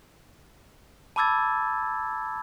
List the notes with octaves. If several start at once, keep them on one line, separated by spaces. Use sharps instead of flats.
A5 B5 D6 E6 G#6 A6